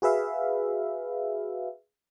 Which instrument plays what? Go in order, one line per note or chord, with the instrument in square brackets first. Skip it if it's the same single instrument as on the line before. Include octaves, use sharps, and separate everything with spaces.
[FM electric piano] F#4 G#4 B4 E5 F5